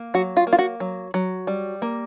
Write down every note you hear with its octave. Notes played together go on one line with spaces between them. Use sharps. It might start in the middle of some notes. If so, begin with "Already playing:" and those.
Already playing: A#3
F#3 F#4
F4
A#3
F4
F#4
F#3
F#3
G3
A#3